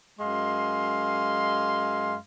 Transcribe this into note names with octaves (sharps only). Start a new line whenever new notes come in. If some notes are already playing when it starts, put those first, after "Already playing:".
F#2 G#3 F5 C6